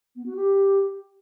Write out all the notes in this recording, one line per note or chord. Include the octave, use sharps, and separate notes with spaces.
B3
F#4
G4